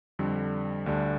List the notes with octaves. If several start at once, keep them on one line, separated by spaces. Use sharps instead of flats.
F2 D3 G3
D2 D3 G3 D4